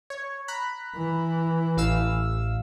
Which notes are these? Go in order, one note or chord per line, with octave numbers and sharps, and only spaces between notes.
C#5
A#5 B5 F#6
E3
A1 F5 E6